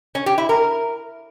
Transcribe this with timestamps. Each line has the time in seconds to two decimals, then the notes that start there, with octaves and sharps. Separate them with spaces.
0.15 C#4
0.26 G4
0.38 E4
0.49 A#4